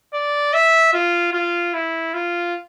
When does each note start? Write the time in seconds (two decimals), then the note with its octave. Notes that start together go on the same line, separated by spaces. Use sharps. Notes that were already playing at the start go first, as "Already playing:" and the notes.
0.14 D5
0.53 E5
0.93 F4
1.33 F4
1.73 E4
2.14 F4